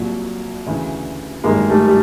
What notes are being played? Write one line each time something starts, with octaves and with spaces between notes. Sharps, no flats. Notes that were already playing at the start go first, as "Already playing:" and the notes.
Already playing: C2 A#2 F#3
D2 C#3 E3
G1 G2 D#3 F#3 G#3 A#3
G3 A3
G3